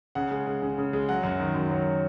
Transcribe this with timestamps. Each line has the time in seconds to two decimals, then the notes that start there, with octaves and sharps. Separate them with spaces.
0.15 C#3 F#5
0.31 G#3
0.47 G#3
0.62 C#3
0.78 C#3
0.93 G#3
1.09 F#3 F#5
1.23 F#2
1.40 D#3
1.55 F#2
1.70 F#3